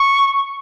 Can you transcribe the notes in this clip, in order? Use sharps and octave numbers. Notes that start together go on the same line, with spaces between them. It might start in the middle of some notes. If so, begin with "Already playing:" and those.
Already playing: C#6